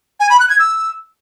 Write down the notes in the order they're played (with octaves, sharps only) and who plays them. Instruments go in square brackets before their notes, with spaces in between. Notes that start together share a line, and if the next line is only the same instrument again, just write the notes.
[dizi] G#5
B5
F#6
G#6
E6